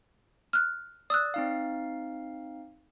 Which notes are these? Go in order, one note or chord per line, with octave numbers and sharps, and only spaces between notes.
F6 F#6
D5 D#6 E6 F#6
C4 D#4 F5